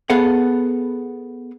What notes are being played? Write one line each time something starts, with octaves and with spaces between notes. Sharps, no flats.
B3 G#4 A4 F5 F#5